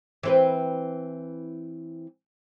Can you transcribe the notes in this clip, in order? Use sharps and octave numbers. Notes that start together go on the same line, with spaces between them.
E3 C4 B4